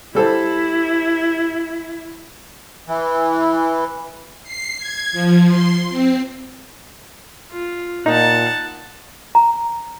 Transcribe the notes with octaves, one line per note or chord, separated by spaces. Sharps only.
G3 E4 A4 C5
E3
C7
G#6
F3
C6
C4
F4
A#2 D#4 F#5 A5
A#5